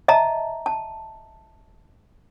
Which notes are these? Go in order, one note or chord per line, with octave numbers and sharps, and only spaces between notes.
D#5 E5 A5 A#5
A5